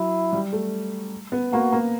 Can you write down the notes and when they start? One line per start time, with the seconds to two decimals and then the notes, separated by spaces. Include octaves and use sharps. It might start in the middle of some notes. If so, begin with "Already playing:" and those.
Already playing: F#3 E4
0.33 G3
0.53 A3
1.32 B3
1.53 A#3 F#4
1.72 A#3